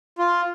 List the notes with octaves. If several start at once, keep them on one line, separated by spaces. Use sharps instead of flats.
F4